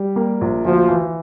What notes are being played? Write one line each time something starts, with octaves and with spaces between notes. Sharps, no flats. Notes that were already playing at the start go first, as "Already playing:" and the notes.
Already playing: G3
A#3
A#1
D2 F3
E3